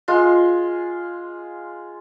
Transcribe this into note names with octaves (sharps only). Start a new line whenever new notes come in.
G#3 F4